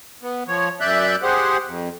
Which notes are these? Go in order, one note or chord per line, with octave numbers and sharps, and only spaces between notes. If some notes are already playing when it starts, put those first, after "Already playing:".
B3
F3 C#5
F#2 D5 E5 F#6 G6
G4 G#4 C5 F#5
F2